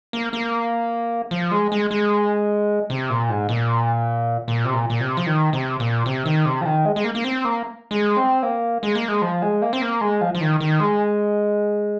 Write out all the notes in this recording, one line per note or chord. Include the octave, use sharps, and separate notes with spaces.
A#3
A#3
F3
G#3
G#3
G#3
C3
A#2
G#2
A#2
A#2
C3
A#2
A#2
C3
F3
D#3
C3
A#2
C3
D#3
C3
F3
D#3
G#3
G#3
A#3
A#3
C4
A#3
G#3
C4
A#3
G#3
A#3
G#3
F3
G#3
A#3
C4
A#3
G#3
F3
F3
D#3
D#3
G#3